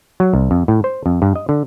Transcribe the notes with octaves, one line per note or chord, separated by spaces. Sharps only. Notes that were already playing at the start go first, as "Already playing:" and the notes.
F#3
C2
F2
A2
C5
F2
G2
D#5
D3